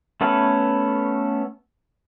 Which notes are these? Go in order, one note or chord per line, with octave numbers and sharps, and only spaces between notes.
A3 B3 C#4 A4 B4